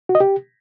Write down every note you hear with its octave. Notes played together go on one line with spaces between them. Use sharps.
F#4
D#5
G4